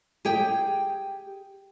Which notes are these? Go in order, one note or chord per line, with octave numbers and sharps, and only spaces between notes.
G4 G#4 G5